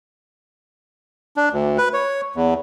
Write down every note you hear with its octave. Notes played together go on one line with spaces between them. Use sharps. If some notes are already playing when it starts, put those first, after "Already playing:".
D4
D2
B4
C#5
E2